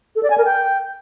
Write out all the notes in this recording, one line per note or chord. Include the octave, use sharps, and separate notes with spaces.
A4
D5
G#5
A#4
G5